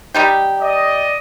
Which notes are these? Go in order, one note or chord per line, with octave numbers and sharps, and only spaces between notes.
G3 D#4 G4
D5 D#5